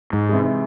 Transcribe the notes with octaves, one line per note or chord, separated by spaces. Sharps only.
G#2
C3 E3 G#3